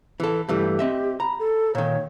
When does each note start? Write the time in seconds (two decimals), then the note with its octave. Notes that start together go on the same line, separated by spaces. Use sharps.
0.20 E3 A4
0.49 G2 E3 A3 G4
0.79 C4 D#5 E5
1.20 A#5 B5
1.39 A4
1.75 A#2 D#3 C#5